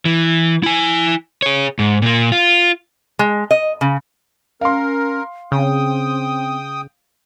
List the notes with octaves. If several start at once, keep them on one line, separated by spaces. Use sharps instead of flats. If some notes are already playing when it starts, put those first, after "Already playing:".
E3
E4 G#5
G#4 C#5
G#2
A#2 A#3
F4
G#3
D#5
C#3
C#4 A#4 F5 C6
C#3 C4 G5 D#6